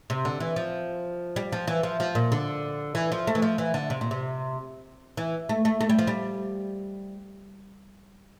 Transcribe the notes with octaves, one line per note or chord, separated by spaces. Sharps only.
C3
D3
E3
F3
G3
F3
E3
F3
F3
A#2
D3
E3
F3
A3
E3
F3
E3
D3
C3
A#2
C3
E3
A3
A3
A3
G3
F3
G3